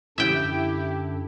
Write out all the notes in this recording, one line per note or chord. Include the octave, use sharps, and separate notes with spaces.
F#2 D3 D4 E4 G4 E5 G5